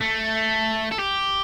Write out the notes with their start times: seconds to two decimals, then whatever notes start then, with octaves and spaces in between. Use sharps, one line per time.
0.01 A3
0.92 A4
0.99 G4